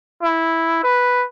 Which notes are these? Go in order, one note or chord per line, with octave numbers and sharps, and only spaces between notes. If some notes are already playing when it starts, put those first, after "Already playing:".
E4
B4